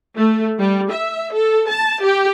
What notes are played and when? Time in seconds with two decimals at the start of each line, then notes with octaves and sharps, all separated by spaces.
0.17 A3
0.59 G3
0.91 E5
1.32 A4
1.69 A5
2.03 G4